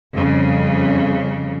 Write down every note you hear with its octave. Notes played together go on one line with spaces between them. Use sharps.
F2 C#3 G3